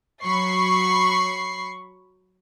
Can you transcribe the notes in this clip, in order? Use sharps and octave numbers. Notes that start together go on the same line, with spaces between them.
F#3 B5 C#6 C7